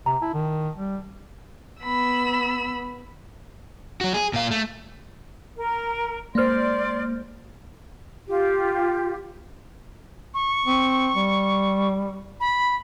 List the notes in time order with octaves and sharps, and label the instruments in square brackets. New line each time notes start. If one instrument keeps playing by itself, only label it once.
[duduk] C3 [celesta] A#5
[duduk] E4 [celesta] A5
[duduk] D#3
G3
[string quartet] B3 B5 E6
[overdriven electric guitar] F#3 F#4
G#4
A#2 F5
A3
[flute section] A#4
[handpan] G#3 C5 [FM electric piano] A#3 F6 [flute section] D5 C6
[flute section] F4 G4
[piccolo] C#6
[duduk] C4
G3
[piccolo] B5